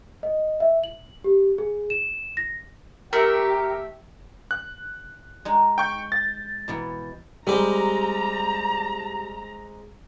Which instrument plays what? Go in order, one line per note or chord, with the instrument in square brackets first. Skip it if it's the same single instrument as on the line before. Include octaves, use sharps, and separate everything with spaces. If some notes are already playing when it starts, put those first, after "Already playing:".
[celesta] D#5
E5
F#7
G4
G#4
E7
A#6
[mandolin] A3 E5 [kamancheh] G4 [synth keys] A#4
[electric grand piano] F#6
[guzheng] G#3 D#4
[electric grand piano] G5 C#6 G6
A6
[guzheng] B2 E3 B3
[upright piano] G3 [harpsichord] G#3 C4 G4 [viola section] A#5